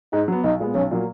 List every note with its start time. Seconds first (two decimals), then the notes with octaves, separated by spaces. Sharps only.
0.13 G#2 D#4
0.28 F#3 B3
0.44 B1 D#4
0.60 A#2 G#3 B3
0.75 B1 C#4
0.91 A#2 F#3 A#3